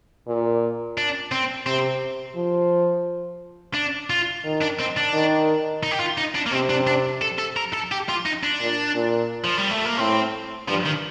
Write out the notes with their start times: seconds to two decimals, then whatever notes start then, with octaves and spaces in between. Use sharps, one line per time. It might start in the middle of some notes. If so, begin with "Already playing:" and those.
0.27 A#2
0.98 D4
1.32 C4
1.66 C3 C4
2.36 F3
3.74 D4
4.10 F4
4.44 D#3
4.61 D4
4.79 C4
4.96 D4
5.13 D#3
5.83 D#4
5.91 G4
6.00 F4
6.18 D#4
6.35 D4
6.46 A#3
6.52 C3 C4
6.69 D4
6.87 D4
7.22 A4
7.39 A4
7.56 A#4
7.73 A4
7.92 G4
8.09 F4
8.26 D#4
8.44 D4
8.60 A#2
8.95 A#2
9.44 F3
9.58 G3
9.71 A3
9.86 A#3
9.98 A2 C4
10.68 G2 F3
10.86 D#3